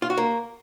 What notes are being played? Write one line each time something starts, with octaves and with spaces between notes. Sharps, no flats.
F4
F#4
A#3